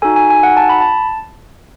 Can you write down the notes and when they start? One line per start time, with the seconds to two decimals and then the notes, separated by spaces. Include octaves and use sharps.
0.02 D#4 F#4 A4 G#5
0.16 G#5
0.30 G#5
0.43 F#5
0.57 A5
0.69 B5
0.81 A5